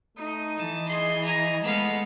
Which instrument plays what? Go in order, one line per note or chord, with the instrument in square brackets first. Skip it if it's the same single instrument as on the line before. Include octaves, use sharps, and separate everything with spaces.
[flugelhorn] A3 [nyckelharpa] D#4
[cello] E3 [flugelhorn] D#5 [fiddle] A5
[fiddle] G#4 C6 [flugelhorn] D#5
[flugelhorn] D#5 [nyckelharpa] G#5 [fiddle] A#5
[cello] G#3 [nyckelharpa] A3 [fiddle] B3 F5